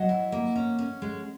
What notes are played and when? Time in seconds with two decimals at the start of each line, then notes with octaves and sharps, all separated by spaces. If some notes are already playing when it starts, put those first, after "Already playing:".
Already playing: F#3 D#5 F#5
0.09 E4
0.32 A#3
0.55 C#4
0.79 C#4
1.02 G#3